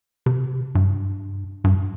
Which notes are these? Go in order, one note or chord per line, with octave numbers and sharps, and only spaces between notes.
C3
G2
G2